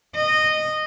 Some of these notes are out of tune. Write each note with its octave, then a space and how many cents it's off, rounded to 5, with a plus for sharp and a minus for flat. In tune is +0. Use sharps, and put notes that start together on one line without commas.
D#5 -15